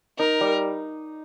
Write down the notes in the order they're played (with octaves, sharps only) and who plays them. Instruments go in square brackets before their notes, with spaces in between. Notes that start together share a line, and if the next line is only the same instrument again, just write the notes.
[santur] D#4 [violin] A#4
[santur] G3